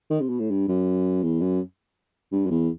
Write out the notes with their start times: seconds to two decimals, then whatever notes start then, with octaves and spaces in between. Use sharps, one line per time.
0.10 D#3
0.21 C3
0.29 B2
0.40 A2
0.50 G2
0.68 F#2
1.23 E2
1.41 F#2
2.32 G2
2.46 F#2
2.50 E2